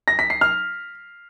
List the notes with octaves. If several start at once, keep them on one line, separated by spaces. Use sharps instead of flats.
A#6
B6
C7
F6